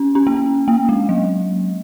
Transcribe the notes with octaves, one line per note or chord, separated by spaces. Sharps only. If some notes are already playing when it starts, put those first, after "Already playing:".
Already playing: C#4
C#4
A#3
A#3
G#3
F#3